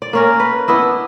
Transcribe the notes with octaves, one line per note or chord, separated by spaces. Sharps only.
D5
A#3 C#4 A#4
B4
B3 D4 E4 D#5